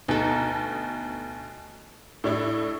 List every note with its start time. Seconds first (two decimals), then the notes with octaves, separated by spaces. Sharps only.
0.08 D2 B2 D#4 A4
2.24 A2 D4 E4